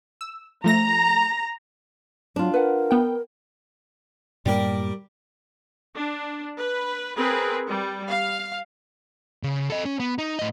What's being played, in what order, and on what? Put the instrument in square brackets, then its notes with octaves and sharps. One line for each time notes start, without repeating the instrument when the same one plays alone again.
[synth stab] E6
[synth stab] F3 A3 A#6 [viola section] A#5
[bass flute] F#3 [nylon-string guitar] D4 F4
[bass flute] A#4 [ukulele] B4 F#5
[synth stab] B3 G5
[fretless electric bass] F#2 A2 A#3 [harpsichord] G3 G4 A#4
[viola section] D4
B4
C4 G#4 A#4 B4
G3
F5
[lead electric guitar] C#3
A4 D#5
C#4 C#5
B3
D#4
A2 D#5